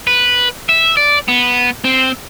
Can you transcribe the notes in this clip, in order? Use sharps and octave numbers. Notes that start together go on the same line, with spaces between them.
B4
E5
D5
B3
C4